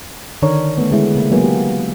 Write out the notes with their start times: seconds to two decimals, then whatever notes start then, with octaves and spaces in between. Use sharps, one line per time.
0.42 D3 D#3 D4 A#4 C#5
0.78 A3 B3
0.91 D3 G#3 E4
1.15 C#3 A#3
1.31 F#3 G#3 A#3 B3 G#4
1.44 G4